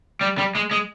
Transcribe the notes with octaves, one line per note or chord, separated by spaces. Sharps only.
G3
G3
G#3
G#3